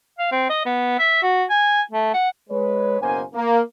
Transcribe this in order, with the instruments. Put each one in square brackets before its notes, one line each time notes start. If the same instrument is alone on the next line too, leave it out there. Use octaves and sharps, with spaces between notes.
[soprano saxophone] F5
C4
D#5
B3
E5
F#4
G#5
A3
F#5
[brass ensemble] G#3 B4 C#5
F#1 B2 A#3 C#4 C5 G#5
A#3